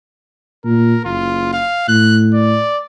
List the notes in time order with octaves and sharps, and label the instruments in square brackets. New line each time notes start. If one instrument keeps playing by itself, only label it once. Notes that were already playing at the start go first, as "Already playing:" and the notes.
[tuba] A#2 [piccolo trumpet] A#4
[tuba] F#1 [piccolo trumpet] F4
[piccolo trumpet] F5
[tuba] A2 [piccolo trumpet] F#6
[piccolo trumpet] D5